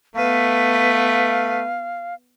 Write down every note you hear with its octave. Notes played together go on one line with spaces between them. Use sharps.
A3 B3 B4 F5